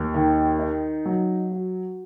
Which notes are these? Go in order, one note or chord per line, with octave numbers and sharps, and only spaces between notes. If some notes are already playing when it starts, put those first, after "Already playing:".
Already playing: D#2
D#3
D#4
F#3
F#4